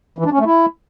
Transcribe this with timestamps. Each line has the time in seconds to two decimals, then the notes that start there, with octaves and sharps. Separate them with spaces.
0.18 E3
0.25 D4
0.32 C#4
0.39 A3
0.46 E4